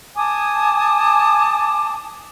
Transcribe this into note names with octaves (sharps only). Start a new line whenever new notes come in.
G#5 A5 D6 D#6